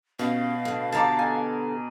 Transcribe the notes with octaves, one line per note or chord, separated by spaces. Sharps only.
B2 C#4 G4 F5
A2 D3
D3 G4 A4 A5 A#5 D6
G#5